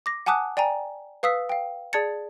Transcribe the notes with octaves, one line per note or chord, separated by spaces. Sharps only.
D6 A#6
F#5 G#5 A5 D6 D#6 F#6
D5 G5 G#5 A#5
B4 F5 D#6 E6 B6
F5 G5
G#4 D5 A5 G#6 A6 C#7